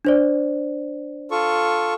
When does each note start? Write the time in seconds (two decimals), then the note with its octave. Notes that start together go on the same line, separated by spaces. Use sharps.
0.05 D4 C5 D5
1.31 F4 A4 C#6